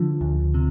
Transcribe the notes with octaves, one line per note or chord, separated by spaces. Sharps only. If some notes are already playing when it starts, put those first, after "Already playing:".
Already playing: D3 F3
D2
C3